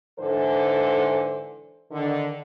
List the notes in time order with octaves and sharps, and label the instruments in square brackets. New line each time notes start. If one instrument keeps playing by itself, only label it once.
[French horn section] G#2 D3 E3 A4 C5
D3 D#3